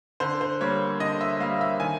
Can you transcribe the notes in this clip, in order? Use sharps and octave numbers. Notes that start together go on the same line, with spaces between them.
D3 C5
C5
G3 A#3 C#5
D3 D#5
E5
G3 A#3 F5
E5
D#3 G#5